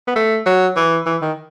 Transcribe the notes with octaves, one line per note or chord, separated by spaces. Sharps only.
B3
A3
F#3
E3
E3
D#3